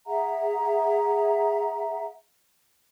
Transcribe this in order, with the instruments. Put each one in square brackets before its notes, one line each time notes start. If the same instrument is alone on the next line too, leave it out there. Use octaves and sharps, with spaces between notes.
[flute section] G#4 E5 F#5 A#5